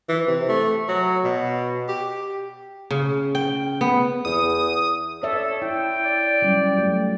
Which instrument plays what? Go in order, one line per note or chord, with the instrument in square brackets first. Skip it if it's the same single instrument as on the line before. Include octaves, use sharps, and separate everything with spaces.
[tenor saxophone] E3
C3
A3
F#3
B2
G4
[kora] C#3
G5
B3
[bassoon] E2 [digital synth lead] D#6
[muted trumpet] A4 [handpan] C#5 D5 E5
[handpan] E4 [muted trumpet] G5
[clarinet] D5
[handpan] F#3 G3 C#4
F#3 A3